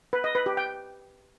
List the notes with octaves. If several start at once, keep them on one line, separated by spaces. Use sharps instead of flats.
B4
D#5
B4
G4
G5